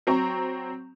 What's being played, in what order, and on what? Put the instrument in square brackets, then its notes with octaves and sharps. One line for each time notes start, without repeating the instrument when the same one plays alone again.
[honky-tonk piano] F#3 C4 A#5 C#6